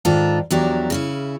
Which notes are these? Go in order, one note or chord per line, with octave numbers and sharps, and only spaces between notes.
G#2 D#3 D4 F4 A4
E2 F3 F#3 D4 G4 A#4
C#3 C#4 E4